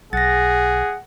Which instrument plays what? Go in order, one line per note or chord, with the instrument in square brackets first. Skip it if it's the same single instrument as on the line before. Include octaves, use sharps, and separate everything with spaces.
[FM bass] B1 [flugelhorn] G#4 [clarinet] F#5 [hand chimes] A6 A#6